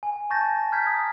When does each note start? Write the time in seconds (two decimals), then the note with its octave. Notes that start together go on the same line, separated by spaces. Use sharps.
0.03 G#5
0.30 A5 C#6 G6 A6 A#6
0.72 A#5 F6 G6 G#6 B6
0.87 D#6